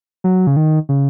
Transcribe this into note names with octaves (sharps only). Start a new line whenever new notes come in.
F#3
C#3
D#3
C#3